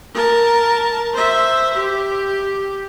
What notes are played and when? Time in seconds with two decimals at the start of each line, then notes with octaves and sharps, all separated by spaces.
0.14 A#4 A5
1.13 C5 E5
1.74 G4